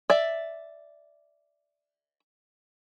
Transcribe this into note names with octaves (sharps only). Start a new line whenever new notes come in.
D5 E5